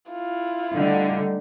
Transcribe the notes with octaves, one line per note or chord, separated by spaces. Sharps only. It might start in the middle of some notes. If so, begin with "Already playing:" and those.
E4 F4
D3 G3 A3 D#4